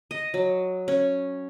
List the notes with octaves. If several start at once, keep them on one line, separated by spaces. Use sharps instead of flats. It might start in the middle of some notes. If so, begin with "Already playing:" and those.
D#5
F#3
C#4